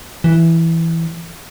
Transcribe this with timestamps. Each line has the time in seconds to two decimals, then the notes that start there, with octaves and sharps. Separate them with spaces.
0.24 E3